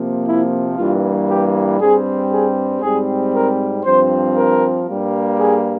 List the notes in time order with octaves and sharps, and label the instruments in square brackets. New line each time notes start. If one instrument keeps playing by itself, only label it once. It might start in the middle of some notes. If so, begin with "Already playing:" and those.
Already playing: [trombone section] C3 F3 A#3
E4
G2 E3 G3 A#3 F4
G4
G2 G3 C4 G#4
G#4
G#2 G3 C4 G#4
A#4
G2 F3 C4 C5
A#4
G2 G3 A#3
G#4